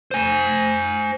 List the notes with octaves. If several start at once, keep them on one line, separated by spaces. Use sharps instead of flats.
C5 G#5